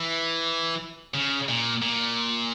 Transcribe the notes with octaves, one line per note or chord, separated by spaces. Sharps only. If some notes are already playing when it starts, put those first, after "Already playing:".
Already playing: E3
C#3
A#2
A#2